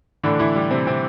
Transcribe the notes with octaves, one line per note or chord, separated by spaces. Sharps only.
A2 D3 E3 D4
E3 E4
G3 G4
C3 C4
C3 C4